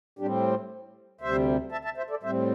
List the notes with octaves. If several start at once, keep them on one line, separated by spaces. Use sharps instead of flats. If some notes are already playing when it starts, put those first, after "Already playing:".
A2 G3 C4 D4 G4
D2 C3 G3 C5 E5
E5 A5
E5 A5
C5 E5
A4 D5
A2 G3 C4 C5 E5